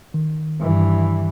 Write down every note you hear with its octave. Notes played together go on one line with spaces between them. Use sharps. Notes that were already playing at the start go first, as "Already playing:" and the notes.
D#3
G2 E3